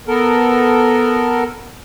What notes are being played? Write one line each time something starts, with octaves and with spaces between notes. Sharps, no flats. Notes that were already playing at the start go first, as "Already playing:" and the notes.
B3 A4 A#4